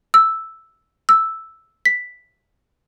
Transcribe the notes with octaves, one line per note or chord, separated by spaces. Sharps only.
E6
E6
B6